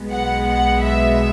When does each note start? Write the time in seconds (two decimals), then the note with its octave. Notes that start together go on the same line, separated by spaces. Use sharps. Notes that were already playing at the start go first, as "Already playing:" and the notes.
Already playing: B1 B2 G#3 B3
0.10 F#5
0.46 F#5
0.82 E5